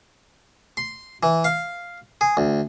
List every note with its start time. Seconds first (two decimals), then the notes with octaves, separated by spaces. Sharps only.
0.77 C6
1.23 E3
1.44 F5
2.21 G#4
2.37 D2